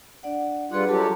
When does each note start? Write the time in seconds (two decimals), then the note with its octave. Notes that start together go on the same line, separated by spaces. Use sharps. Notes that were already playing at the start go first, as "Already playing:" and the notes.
0.23 D4 D5 F#5
0.71 G3 D4 F4 G#4 B4 F#5
0.89 F#3 G#3 F4 G4 A4 A5